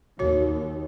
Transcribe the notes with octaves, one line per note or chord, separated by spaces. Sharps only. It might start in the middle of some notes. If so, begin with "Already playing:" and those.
D#2 F#4 C#5